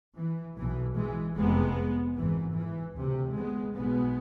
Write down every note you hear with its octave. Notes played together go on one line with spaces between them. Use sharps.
E3
B1 B2 E3
E3 G#3
F1 F2 C3 G#3 B3
G#1 G#2 E3
E3
D2 C3
G#3 B3
B1 B2 G#3 B3